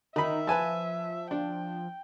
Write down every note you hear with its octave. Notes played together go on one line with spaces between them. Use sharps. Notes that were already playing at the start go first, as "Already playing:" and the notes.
D#3 D#4 E5 B5
F3 B4 G#5 A5
D4 G5